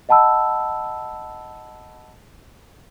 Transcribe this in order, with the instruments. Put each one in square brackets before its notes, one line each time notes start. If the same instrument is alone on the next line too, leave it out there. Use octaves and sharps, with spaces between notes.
[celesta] D#5 F#5 A5 B5 E6